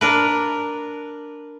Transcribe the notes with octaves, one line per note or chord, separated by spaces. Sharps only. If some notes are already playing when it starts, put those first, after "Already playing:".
D4 A#4 B4